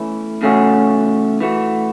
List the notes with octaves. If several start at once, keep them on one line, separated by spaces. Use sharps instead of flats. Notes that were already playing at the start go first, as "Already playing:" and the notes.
Already playing: E2 E3 A3 C#4 E4
E2 C#3 A3 C#4 F#4
E3 A3 F#4